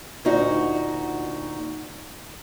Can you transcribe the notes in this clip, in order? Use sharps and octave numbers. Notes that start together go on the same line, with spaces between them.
D2 A#2 D#4 F#4